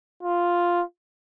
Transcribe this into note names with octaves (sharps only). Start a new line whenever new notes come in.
F4